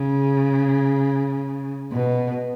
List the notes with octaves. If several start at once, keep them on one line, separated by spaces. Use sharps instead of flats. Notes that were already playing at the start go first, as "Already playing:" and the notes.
Already playing: C#3
B2